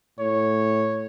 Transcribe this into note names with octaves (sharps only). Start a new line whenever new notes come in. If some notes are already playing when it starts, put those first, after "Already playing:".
A2 C#5